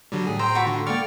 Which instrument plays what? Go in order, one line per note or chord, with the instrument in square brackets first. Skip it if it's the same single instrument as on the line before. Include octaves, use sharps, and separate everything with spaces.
[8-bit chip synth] D3 F#3 G3
[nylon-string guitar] A2 [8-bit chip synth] G#4
[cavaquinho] C5 [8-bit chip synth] G5 A#5 E6
[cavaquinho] F4 F#4 B5
[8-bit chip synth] D3
[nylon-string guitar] A#3 A4 G5 [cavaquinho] D5 [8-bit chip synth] C#6 F6 A6